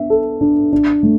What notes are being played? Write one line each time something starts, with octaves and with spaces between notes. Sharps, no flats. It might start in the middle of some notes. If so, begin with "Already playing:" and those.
Already playing: B3 D4 E5
A4
D4
D4
A3